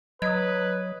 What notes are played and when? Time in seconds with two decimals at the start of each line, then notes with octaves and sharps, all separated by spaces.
0.22 F#3 B4 D#5 D#6 G#6